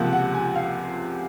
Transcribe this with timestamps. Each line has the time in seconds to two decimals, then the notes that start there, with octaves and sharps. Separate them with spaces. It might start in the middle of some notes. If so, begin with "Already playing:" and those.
Already playing: C#2 C3 F3 A#3 F#5
0.13 F#5
0.34 G#5
0.55 F5